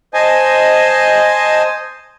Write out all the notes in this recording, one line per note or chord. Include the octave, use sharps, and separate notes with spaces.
C5 D#5 G#5 A5